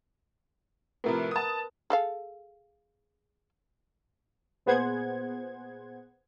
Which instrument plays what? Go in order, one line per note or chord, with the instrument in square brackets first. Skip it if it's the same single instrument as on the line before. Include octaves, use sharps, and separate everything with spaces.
[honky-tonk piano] A2 C3 F3 [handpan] A#4 B4
[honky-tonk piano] A5 D#6
[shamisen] G#4 A4 F5
[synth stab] A#2 B3 G#4 C5 F#5 G#6